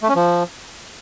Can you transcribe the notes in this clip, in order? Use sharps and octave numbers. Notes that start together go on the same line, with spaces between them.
A3
C#4
F3